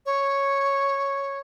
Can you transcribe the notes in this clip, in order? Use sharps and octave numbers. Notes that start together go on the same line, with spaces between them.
C#5